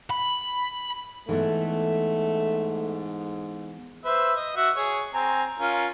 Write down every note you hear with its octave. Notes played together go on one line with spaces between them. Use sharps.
B5
G#2 E3 A3 B3
B4 C5 E5
D#5
F#4 E5 F#5
G#4 C#5
C4 G#5 A#5
C#4 F4 A#4